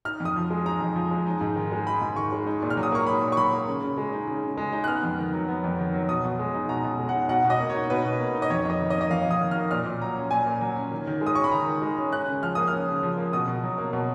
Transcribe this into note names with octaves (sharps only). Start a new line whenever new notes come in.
D#4 F6
F2
D#6
F3
G#3
D#4 A#5
F2
F3
G#3
D#4
G#2
D#3
G#3
D#4 B5
G#2
D#3 C#6
G#3
D#4
A#2
F6
F#3
D#6
A#3 C#6
D#4 B5
A#2
C#6
F#3 B5
A#3
C#3
C#3
G#3
D#4
C#3
C#3
G#3
D#4
F#6
B3 F6
F2
D#3
F#3
B3
F2
D#3
F#3
B2 D#6
B2
G#3
D#4
B2 A#5
B2
G#3
F#5
D#4
B2 F#5
B2
D#5
A#3
C#5
D#4
B2 B4
B2
A#3
D#4
D#5
F2 C#5
F2 D#5
D#3
D#5
A#3
D#5
F2 F5
F2
D#6
D#3
A#3 F6
A#2 F6
A#2
F#3 A#5
C#4
A#2 G#5
A#2
F#3
C#4
D#3
D#3
G#3
D#6
C#4 C#6
B5
D#3 A#5
D#3
G#3
C#4
C#4 F#6
C#3
F3 F6
A#3 D#6
F6
C#4
C#3
F3
A#3
B2 D#6
B2
F#3
A#3
B2